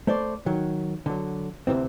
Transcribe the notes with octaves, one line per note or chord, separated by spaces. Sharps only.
A3 C5 D5
D#3 F#3
D3 F#3
D2 G#2 C3 E3 C4